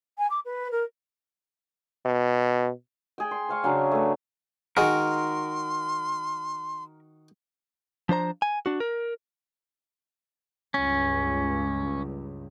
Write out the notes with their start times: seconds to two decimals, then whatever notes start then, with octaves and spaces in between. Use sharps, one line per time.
0.18 G#5
0.30 D6
0.45 B4
0.71 A#4
2.05 B2
3.18 G#4 G5
3.31 C6
3.49 C5 F5 C#6
3.64 C#3 F#3 C#4 D4
3.91 A3 B4
4.77 D#3 G#3 D#4 F#4 G#4 A#4 C6
8.09 F3 D4 C5 A#5
8.42 G#5
8.66 D4 F#4
8.80 A#4
10.74 C#2 G2 C#4